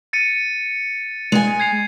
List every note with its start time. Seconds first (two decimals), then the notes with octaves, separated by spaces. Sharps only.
0.13 A6 C#7 D#7
1.32 G#3 G#5
1.60 G#6 C7 F7